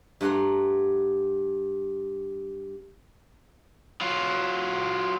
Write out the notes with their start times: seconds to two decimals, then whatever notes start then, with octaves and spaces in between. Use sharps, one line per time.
0.21 G2 A3 F#5 A#5 C6
4.01 F#3 F4